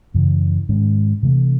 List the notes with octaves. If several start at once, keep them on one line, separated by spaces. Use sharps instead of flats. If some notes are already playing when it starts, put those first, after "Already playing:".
F#2 C#3 E3
G#2 D#3 G#3 C#4
C3 E3 A3